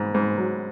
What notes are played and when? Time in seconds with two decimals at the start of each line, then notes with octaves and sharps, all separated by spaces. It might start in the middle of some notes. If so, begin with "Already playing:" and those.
Already playing: G#2
0.14 G#2
0.38 F#3